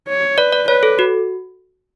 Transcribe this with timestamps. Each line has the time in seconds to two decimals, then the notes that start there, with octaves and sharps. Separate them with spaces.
0.08 C#5
0.38 B4 D5
0.52 D5
0.68 B4 C#5
0.83 A4
0.99 F#4